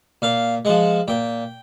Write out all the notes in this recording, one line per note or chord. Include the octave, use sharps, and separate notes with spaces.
A#2 F5
F3 G#3 F#5
A#2 G5